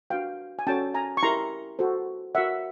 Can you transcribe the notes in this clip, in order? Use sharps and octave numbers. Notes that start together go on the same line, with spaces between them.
D4 F#4 B4 F5 G5
G#5
C#4 F#4 A4 C#5 G5 A5
G#5 A#5
C#6
E4 G4 A#4 A#5 C6
F#4 A4 C5
F#4 A#4 C#5 E5 F#5